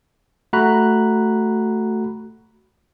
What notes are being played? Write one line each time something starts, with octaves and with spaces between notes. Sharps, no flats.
A3 F#4 A#5 B5 F#6